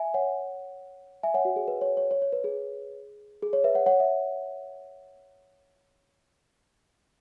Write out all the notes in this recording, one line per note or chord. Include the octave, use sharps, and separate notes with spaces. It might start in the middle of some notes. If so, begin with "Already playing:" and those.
Already playing: E5 G#5
C#5 F#5
E5 G#5
C#5 F#5
F#4
G#4
B4
C#5
C#5
C#5
C#5
B4
G#4
G#4
C#5
B4 E5
C#5 F#5
C#5 F#5
E5